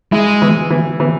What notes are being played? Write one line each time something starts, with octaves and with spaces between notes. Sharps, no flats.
G#3 E4
E3
E3
E3